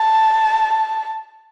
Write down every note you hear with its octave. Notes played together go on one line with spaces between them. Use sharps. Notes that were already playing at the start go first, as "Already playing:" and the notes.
Already playing: A5